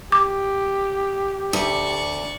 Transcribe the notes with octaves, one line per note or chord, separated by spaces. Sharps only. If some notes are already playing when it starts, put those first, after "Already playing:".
G4 D6
D2 D5 C#6